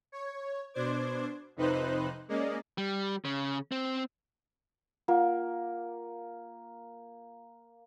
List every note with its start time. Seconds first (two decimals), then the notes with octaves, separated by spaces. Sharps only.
0.12 C#5
0.74 B2 D4 C5 D6 G#6
1.56 F2 C3 D#4 B4 C5 F#6
2.28 G#3 A#3 C#4 D5 D#5
2.78 G3
3.25 C#3
3.72 C4
5.08 A#3 F4 F#5